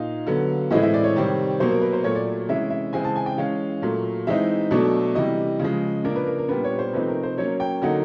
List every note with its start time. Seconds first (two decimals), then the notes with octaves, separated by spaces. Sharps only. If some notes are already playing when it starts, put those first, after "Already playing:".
Already playing: A#2 D#4 F5
0.27 D3 F#3 B3
0.71 A2 E3 G#3 C4 E4 D#5
0.83 E5
0.94 D5
1.04 C#5
1.16 C3 D#3 G3 C4
1.60 B2 F#3 A#3 C5
1.71 A#4
1.82 B4
1.93 C5
2.04 A#2 F#3 A3 C#5
2.15 D5
2.49 C3 E3 G#3 C#4 E4 E5
2.70 E5
2.93 C#3 E3 G#3 C4 G#5
3.04 A5
3.16 G#5
3.26 G5
3.38 E3 G#3 C#4 F5
3.82 A#2 F#3 A3
4.27 E3 G#3 C4 D#4 E5
4.71 B2 F#3 A3 D4
5.15 C3 E3 G3 D#5
5.60 C#3 F3 G#3
6.04 C#3 F3 A#3 D4 A#4
6.16 B4
6.27 A#4
6.38 A#4
6.48 A#2 G3 B3 D4 B4
6.64 C#5
6.79 C5
6.93 C3 F3 A3 C4 D#4 B4
7.08 A#4
7.23 C5
7.37 F#3 A#3 C#4 C#5
7.60 G5
7.82 D3 F#3 A#3 D#4 F#5